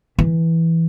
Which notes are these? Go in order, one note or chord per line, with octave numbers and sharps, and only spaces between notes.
E3